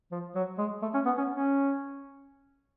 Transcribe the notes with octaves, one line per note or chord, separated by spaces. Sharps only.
F3
F#3
G#3
A3
C#4
B3
C#4
C#4